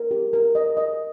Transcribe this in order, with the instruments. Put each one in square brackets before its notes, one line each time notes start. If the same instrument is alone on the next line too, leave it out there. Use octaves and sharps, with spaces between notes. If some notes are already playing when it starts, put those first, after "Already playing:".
Already playing: [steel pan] A#4
G4
A#4
D#5
D#5